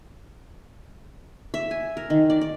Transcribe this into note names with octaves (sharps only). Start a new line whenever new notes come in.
E5
G#5
A#4
D#3
D5
D5